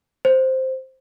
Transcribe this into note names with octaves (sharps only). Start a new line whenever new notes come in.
C5